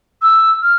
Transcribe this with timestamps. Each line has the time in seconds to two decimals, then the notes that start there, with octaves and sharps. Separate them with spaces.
0.22 E6
0.62 F6